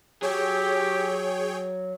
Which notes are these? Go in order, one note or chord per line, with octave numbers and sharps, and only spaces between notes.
F#3 G4 G#4 C#5 G5